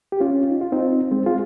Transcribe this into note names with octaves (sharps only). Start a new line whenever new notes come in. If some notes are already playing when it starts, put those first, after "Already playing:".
G4
C#4 F4
D#4
F4
C4 D#4
G#3 C4
F4 G#4